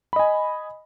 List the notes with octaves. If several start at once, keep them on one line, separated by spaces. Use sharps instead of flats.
D#5 G#5 B5